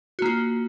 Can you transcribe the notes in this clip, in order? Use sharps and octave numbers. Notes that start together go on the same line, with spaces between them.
A#3 F4 F#4